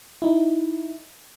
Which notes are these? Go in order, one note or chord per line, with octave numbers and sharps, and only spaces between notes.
D#4 E4